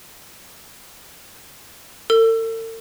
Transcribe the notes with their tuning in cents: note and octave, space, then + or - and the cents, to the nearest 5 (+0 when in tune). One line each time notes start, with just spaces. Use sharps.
A4 +45 E6 +25